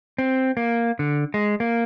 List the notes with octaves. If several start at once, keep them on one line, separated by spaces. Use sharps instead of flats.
C4
A#3
D3
G#3
A#3